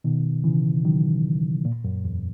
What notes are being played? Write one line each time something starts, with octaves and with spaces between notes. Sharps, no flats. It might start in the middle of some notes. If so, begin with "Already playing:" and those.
B2 D#3
C#3 E3
D#3 F#3
A#2
F#2
E2